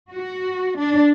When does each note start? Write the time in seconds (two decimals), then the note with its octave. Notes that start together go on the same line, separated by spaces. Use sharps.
0.14 F#4
0.78 D4